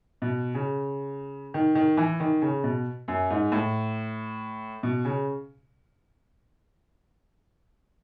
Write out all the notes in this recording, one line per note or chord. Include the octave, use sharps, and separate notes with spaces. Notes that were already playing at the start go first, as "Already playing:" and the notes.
B2
C#3
D#3
D#3
E3
D#3
C#3
B2
F#2
G#2
A2
B2
C#3